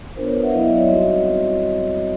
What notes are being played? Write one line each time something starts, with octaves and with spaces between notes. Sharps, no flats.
B3 D4 F4 A#4 C5
B4 C#5
E5 F#5
F#3 B3 E4 D#5 F5
D5 E5
C#5 D#5
G3 C4 D#4 F#4 C#5 D#5